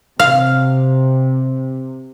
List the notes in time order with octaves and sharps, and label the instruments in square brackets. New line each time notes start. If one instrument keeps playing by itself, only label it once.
[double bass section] C3 [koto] F5